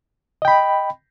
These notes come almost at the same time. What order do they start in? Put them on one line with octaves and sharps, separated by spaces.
D#5 G5 B5